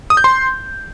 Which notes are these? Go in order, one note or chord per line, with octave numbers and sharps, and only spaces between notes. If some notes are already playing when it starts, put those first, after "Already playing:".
D#6
G6
C6